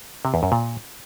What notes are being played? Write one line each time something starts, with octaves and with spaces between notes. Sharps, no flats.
C3
E2
F#2
A#2